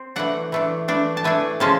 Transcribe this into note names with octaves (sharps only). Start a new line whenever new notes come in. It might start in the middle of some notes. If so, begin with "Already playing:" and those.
Already playing: C4
E3 A3 D4 F#5
E3 A3 D4
E3 A3 D4
A5
E3 A3 D4 G#5
C#3 F3 G#3 C#4 A5